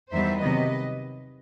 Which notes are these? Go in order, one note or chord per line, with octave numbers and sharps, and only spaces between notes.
E2 D#3 G3 B3 C5 E5
C3 D#3 F#3 B3 B4 D#5